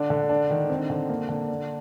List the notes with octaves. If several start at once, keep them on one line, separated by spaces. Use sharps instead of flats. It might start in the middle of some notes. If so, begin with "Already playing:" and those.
Already playing: D3 D4
D3
D4
D#3
C4
D3
A#3
D3
D4